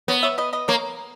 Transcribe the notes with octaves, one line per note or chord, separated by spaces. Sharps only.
B3 A#4 C#5
C#5 E5
B4 D#5
B4 D#5
A#3 A#4 C#5